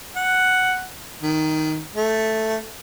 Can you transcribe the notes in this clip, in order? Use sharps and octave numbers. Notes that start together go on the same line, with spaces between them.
F#5
D#3
A3